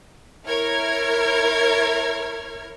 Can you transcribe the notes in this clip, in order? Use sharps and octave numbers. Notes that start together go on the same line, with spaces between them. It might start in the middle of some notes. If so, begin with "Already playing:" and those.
E4 A#4 C#5 F6 G#6